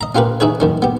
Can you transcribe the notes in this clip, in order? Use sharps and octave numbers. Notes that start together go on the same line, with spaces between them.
D#5 A#5
C#4 F4 G4 A#4 B4
D#4 E4 G#4 B4 C#5
F#2 D#3 C#4
B3 G4